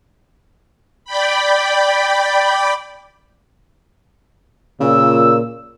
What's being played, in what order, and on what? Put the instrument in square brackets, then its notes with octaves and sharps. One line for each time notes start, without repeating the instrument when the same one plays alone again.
[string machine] D5 G5 B5
[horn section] A#2 [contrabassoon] C#3 [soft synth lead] E6